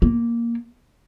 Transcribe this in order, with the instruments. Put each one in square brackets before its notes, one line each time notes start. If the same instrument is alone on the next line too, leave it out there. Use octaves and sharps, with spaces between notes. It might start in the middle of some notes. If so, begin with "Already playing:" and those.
[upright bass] A#3